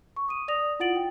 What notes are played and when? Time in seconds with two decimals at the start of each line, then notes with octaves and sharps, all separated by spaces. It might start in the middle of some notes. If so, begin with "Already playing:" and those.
0.16 C#6
0.28 D#6 D#7
0.48 D5 D#6 A#6 F7
0.80 E4 F4 F#5 A6 D7 F#7
0.96 G5